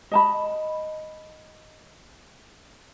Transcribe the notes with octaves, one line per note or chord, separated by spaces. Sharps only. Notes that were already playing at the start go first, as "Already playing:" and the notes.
D#5 A5 B5